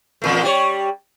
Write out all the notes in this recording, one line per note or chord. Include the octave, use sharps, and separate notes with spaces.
E2 A#2 A3
G3 F4 C#5